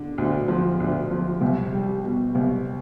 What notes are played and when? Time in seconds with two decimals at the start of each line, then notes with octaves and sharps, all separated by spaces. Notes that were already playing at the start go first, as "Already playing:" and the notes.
Already playing: D3
0.18 D2
0.48 F3
0.80 D2
1.11 F3
1.41 C2
1.73 G3
2.04 B2
2.35 C2